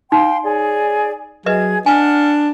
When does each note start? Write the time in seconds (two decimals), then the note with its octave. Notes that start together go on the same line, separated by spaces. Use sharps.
0.12 D#4 F5 G5 C6
0.43 G#4 C#5 D5
1.46 F#3 G#4 B4 D#5 E5 G#6
1.86 D4 F#5 G#5 F6